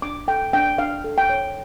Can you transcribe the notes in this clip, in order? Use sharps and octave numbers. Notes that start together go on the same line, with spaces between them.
D4 D6
A4 G5
D4 G5
D4 F5
A4
G5
C#5